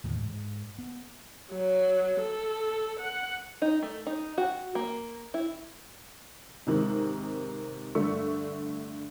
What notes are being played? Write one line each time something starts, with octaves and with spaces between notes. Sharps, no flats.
D#2 A2 D3 E3
G#2
B3
F#3
A4
F#5
D#4
A3
D#4
F#4
A#3
E4
G#2 C3 D#3
G2 D3 A3 C#6